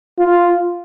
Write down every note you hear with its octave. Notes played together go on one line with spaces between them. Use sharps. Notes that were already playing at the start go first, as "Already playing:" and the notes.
F4